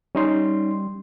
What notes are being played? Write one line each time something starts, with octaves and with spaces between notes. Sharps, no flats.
G3 C#4 D#4 C6